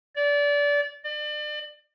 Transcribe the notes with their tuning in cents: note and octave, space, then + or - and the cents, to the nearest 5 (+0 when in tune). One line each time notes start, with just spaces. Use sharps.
D5 -25
D5 +35